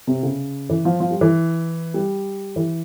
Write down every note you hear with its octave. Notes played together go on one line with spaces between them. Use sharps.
C3
C#3
E3
F3
F3
G3
E3
G3
E3